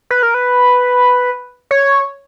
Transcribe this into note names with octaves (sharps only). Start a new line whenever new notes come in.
B4
A#4
B4
C#5